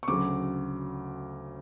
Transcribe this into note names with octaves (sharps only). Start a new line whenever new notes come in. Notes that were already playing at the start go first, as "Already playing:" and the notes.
C#6
D2 C#3 F#3 D6